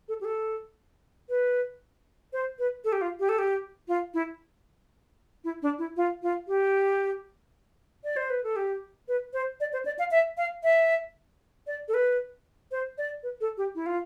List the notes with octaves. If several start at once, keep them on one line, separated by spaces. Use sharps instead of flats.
A4
G4
A4
B4
C5
B4
A4
G4
F4
G4
A4
G4
F4
E4
E4
D4
E4
F4
F4
G4
D5
C5
B4
A4
G4
B4
C5
D5
C5
D5
F5
E5
F5
E5
D5
A4
B4
C5
D5
B4
A4
G4
E4
F4